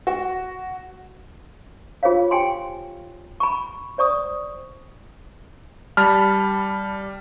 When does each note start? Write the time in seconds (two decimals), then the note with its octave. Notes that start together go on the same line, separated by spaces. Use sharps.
0.07 F#4
2.03 F4 G#4 A#4 C5 C#5 F5
2.31 G4 G5 G#5 C6
3.40 B5 C#6
3.98 C5 D5 C#6 D#6
5.97 G3 A5 B5 F6